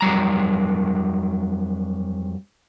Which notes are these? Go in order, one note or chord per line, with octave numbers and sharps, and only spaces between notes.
F2 F#3 G3 A#5